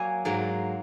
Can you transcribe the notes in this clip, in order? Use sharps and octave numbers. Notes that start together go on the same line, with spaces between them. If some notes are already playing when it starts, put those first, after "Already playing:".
Already playing: F#3 A#3 G#5
G#2 F#3 A#3